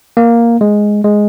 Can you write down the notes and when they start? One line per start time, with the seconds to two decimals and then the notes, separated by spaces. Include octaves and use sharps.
0.17 A#3
0.61 G#3
1.04 G#3